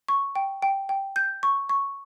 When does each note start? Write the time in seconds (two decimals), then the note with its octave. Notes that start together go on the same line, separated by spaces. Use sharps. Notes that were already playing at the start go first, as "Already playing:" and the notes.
0.08 C#6
0.35 G5
0.62 G5
0.89 G5
1.16 G6
1.43 C#6
1.69 C#6